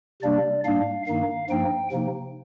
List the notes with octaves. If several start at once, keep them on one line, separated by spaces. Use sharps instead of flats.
C3 G3 A#3 D4 D5
G#2 G3 A#3 D4 F5
G2 D#3 A#3 D#4 F5
G2 F3 A#3 D#4 G5
C3 F3 A#3 D#4